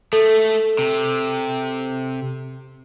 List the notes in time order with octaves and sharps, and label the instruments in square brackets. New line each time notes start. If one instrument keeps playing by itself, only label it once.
[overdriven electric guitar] A3 [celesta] A4
[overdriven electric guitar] C3